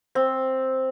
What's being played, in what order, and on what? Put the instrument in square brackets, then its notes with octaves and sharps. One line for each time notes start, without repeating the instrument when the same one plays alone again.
[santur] C4